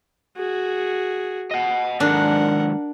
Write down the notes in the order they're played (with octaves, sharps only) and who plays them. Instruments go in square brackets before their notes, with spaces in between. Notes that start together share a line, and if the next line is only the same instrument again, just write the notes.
[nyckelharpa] F#4 G#4
[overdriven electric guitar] D#5 F#5
[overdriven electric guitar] D#2 G#2 [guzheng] D4 [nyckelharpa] A#4 F#5